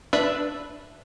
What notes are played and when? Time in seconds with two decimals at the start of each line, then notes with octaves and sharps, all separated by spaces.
0.13 D4 B4 E5